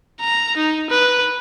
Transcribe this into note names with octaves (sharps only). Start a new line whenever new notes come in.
A#5
D#4
B4